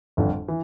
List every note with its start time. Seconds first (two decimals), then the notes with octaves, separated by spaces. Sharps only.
0.17 G1 F2 D3
0.48 E3